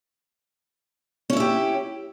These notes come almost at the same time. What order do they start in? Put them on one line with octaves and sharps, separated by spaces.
C#4 E4 E5 G4